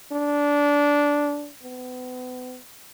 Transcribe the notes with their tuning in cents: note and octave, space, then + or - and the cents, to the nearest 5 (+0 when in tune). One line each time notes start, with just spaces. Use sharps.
D4 -15
B3 +35